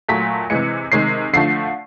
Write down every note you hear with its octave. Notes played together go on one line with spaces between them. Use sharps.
A#2 F#3 A3 B6
C3 E3 G#3 C#7
C3 D#3 G#3 C7
D3 F3 A3 C7